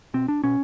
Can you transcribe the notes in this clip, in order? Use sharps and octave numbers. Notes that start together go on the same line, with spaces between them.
B2 C4
D4
B2 C#4